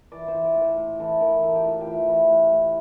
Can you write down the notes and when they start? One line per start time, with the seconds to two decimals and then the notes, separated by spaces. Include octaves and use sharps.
0.12 E3 D5
0.28 C5
0.34 E3
0.45 D5
0.55 A2
0.61 C5
0.77 A2
0.99 E3 A4
1.21 E3 A#4
1.43 A2 A4
1.55 G4
1.65 A2 F4
1.81 G4
1.86 E3
2.08 E3
2.30 A2
2.53 A2